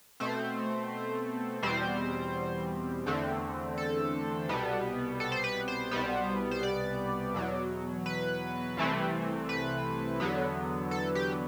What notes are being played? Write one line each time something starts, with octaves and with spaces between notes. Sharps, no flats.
B2 A3 C4 C5
E2 B2 G3 C4 C5
E2 D3 A3 C4
A4
C2 B2 G3 B3
A4
C5
B4
C5
C2 B2 G3 B3
C5
D5
E2 B2 F#3
B4
C2 C3 E3 A3 C4
B4
E2 D3 F#3 B3
A4
G4